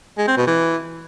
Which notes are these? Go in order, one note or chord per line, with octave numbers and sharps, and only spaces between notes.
G#3
C4
B2
E3